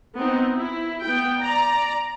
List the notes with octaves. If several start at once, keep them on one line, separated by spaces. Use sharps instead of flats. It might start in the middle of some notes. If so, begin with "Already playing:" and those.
B3 C4 D#4
E4
B3 G5
D5 A#5